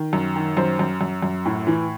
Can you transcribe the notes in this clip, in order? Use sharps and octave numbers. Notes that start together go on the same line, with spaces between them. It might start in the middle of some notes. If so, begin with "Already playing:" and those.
Already playing: D#3
F#2
D#3
F#2 C5
F#2
F#2
F#2
A2
E3